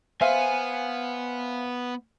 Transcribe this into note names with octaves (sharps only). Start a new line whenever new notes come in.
B3 C5 E5 F5 G#5